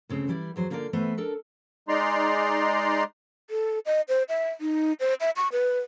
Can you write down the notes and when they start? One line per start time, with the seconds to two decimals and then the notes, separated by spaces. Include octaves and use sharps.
0.09 D2 C#3 C4
0.28 E3 G3 E4 D5
0.56 E2 F#3 C5
0.70 D3 A#3 F4 A#4 C#5 D5
0.93 E3 A3 B3 B4 C5 E5
1.17 D4 A4 A#4
1.89 G#3 D#4 D5 A#5 C6
3.50 A4
3.86 D#5
4.09 C5
4.29 E5
4.61 D#4
5.00 C5
5.20 E5
5.36 C#6
5.52 B4